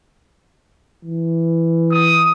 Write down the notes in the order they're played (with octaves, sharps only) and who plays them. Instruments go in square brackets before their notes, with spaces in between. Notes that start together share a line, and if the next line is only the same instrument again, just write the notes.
[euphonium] E3
[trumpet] D#6